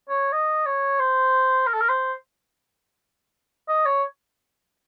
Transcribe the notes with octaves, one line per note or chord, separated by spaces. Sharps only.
C#5
D#5
C#5
C5
A#4
A4
A#4
C5
D#5
C#5